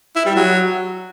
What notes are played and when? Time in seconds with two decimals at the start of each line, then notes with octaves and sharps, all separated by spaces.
0.16 E4
0.26 G3
0.36 F#3